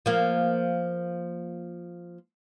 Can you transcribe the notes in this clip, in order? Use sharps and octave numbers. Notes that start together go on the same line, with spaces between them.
F3 A#3